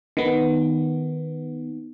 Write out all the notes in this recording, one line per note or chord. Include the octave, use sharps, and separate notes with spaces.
D#3 B3